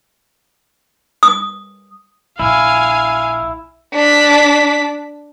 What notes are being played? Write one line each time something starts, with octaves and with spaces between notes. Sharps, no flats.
D#6
A#1 E4 F5 G#5
D4 B6